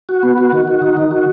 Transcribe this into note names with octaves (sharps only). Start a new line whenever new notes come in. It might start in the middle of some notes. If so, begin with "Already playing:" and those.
F#4
B3
F#4
D#3
F#4
D#4
D#3
F#4